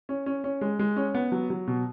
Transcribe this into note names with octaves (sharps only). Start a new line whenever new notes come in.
C#4
C#4
C#4
G#3
G#3
C#4
B3
F#3
F#3
B2